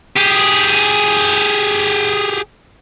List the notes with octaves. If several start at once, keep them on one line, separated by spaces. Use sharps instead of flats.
G4 G#4